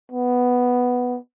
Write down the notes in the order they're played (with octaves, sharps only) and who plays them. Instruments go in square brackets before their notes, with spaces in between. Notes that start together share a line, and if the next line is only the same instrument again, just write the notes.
[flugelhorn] B3